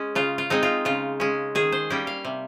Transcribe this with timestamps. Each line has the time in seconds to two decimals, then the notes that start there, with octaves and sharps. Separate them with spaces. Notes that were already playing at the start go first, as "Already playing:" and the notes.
Already playing: G#3 C#4
0.15 C#3 F4
0.38 F4
0.50 G#3 C4 D#4
0.63 F4
0.85 C#3 F4
1.20 G#3 C#4
1.55 D#3 G#4
1.72 C5
1.90 G3 A#3 C#4 G5
2.07 F5
2.25 C3